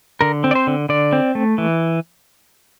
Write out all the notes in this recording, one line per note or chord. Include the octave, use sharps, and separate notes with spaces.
D3 A#4
C4
D5
C5
D3
D3 D5
C4
A3
E3